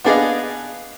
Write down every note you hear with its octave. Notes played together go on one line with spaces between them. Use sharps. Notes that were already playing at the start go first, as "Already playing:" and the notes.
B3 D4 G#4 D5 D#5 F5